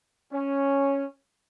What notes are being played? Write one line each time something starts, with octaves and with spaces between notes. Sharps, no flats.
C#4